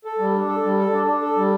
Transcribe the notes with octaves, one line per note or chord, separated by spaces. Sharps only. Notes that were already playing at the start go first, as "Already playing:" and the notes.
A4
G3
D4
A4
G3
A4
D4
D4
A4
G3